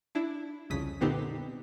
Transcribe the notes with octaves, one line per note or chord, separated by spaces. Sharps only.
D4 E4
C2 F2 C#3 D#6 B6
A#2 D3 B3 C4 D#4 G4